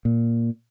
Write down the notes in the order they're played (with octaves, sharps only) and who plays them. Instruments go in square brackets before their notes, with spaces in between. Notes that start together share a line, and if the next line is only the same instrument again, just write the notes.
[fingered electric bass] A#2